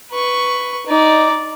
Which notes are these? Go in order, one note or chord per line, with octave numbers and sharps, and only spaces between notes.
B4 C#6
D#4 D5